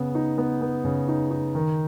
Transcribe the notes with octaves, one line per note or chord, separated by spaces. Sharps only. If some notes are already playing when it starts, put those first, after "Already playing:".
Already playing: C#3 B3
D#4
B3
B3
C#3
D#4
D#4
D#3